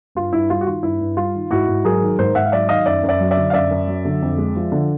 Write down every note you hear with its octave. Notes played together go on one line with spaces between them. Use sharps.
G2 F4
G2 E4
G3 F4
F#4
D#3 F4
G2 E4
G2
G3 F4
D#3
G#2 E4 F#4
G#2
F#3 G#4 A#4
D#3
G#2 A#4 C5
G#2 E5 F#5
F5
F#3 D5 E5
D#3 D#5 F5
F#2 D5 E5
F#2
D5 E5
F#3
D5 E5
D3
F5
F#2 D5 E5
F#2
F#3
D3
F2
G#3
F3
D3